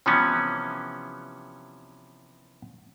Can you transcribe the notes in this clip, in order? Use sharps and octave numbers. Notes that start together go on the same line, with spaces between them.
C3 E3 F3 G3 B3 C#4